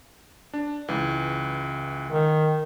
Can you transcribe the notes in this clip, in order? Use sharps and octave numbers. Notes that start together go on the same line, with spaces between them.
D4
C#2 E3
D#3